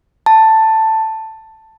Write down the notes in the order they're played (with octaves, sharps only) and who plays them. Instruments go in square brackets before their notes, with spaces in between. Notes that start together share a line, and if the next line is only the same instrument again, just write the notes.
[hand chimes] A5